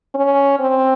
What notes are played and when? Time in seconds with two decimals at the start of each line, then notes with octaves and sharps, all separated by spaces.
0.15 C#4
0.59 C4